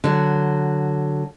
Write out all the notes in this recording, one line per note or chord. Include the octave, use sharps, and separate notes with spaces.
D3 F#3